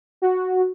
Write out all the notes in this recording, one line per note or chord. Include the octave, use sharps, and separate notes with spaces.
F#4